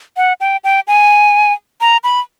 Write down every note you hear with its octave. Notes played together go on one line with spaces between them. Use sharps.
F#5
G5
G5
G#5
A#5
B5